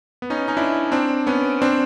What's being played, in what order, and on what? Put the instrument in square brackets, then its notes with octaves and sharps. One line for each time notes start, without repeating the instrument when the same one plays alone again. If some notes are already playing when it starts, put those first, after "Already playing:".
[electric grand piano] B3
C#4 D#4
C#4 D#4
D4 E4
C4 D4
B3 C#4
C4 D4